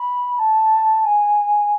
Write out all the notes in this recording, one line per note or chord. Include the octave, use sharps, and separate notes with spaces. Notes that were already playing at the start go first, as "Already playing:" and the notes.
Already playing: B5
A5
G#5